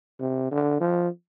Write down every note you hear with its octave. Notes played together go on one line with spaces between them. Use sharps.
C3
D3
F3